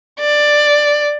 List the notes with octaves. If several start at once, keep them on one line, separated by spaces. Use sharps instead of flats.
D5